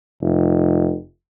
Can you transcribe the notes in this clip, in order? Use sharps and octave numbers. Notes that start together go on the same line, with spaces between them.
F1